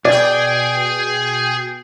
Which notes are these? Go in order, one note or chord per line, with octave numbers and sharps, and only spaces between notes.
B2 G#4 D5 G5 G#5